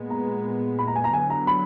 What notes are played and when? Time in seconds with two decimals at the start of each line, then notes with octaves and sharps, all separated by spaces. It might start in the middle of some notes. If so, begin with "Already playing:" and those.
Already playing: A#2 G#3 B3
0.10 A#5
0.79 B5
0.87 A#5
0.96 G#5
1.04 A#5
1.13 D3 F#3 B3 G#5
1.30 A#5
1.47 B5